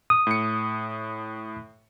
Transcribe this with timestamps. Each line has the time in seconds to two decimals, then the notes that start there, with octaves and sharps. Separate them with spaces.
0.10 D#6
0.27 A2 C#7